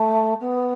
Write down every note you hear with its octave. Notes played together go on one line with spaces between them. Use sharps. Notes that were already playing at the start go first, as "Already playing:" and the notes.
Already playing: A3
B3